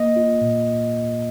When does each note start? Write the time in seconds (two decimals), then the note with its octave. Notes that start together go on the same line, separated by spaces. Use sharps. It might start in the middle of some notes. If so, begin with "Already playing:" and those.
Already playing: A#3 D#5
0.16 F4
0.41 A#2